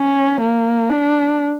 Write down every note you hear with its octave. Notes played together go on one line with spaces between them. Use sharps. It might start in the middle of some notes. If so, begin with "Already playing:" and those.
Already playing: C#4
A#3
D4